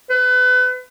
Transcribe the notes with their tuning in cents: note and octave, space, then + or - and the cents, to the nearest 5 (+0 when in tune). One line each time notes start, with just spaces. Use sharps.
B4 +30